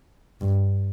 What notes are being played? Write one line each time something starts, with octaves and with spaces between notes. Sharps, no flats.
G2